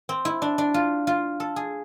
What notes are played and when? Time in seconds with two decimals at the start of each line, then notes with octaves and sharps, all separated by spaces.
0.09 C4
0.25 E4
0.42 D4
0.58 D4
0.74 F4
1.07 F4
1.40 A4
1.56 G#4